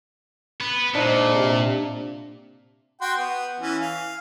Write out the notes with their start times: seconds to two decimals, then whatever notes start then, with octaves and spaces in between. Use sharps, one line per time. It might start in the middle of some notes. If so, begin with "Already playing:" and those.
0.61 B3
0.95 A#2 G#3 D4 D#4 C5
1.34 C3
3.01 F#4 G5 C6
3.17 B3
3.60 E3 C#4
3.80 F5